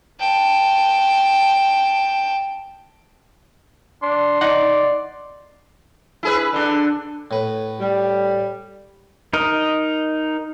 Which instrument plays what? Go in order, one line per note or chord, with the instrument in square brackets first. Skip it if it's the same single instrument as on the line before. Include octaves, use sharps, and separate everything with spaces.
[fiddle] G5 A5
[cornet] D4 [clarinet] C6
[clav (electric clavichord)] D#4 F#5 [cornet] D5
[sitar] E4 G#4 B4
D3 D4
[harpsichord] A2 B4
[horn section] G3
[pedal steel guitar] D#4 A#4 D#5